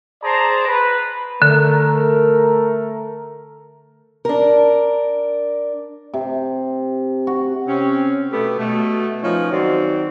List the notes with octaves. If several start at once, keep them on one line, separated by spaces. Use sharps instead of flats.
G#4 C5 D5 A5 A#5
B4
D3 A3 A#4
D4 A#4
C3
F#4
C3 C4 C#4
B2 A3 B3 G4 A4
B2 A3
F3 C#4 D#4 B4 C#5
D#3 F#3 C4 F#4 D5